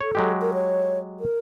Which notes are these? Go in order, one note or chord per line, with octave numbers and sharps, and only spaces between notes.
A4 C#5
F#3 G#3 G4
A#4
C#5
A#4